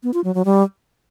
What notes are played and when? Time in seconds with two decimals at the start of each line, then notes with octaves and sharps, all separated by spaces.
0.03 B3
0.14 F4
0.24 F#3
0.35 F#3
0.45 G3